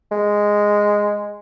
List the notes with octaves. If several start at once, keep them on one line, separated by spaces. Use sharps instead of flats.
G#3